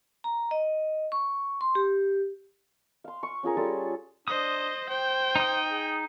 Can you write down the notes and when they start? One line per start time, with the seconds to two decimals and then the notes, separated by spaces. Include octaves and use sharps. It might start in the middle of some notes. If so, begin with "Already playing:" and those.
0.24 A#5
0.51 D#5
1.12 C#6
1.61 C6
1.75 G4
3.04 F5 C6
3.23 C#6
3.43 C#4 F4 G#4 A#4
3.57 G3 F4 G#4 A4
4.28 D4 C5 D#5 D#6
4.90 C5 G5
5.36 D#4 D#6
5.71 G#4